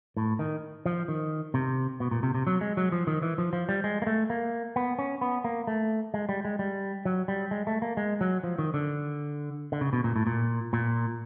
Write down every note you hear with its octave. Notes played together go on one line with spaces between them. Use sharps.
A2
D#3
F3
D#3
C3
B2
A#2
C3
C3
F#3
G#3
F#3
F3
D#3
E3
F3
F3
G3
G#3
A#3
A3
A#3
B3
C#4
B3
A#3
A3
G#3
G3
G#3
G3
F#3
G3
G#3
A3
A#3
G#3
F#3
F3
D#3
D3
D3
C#3
B2
A#2
A2
A#2
A#2